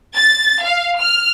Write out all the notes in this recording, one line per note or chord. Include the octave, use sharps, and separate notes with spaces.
A6
F5
F6